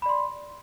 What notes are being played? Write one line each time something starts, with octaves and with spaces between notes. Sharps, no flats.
D5 B5 C6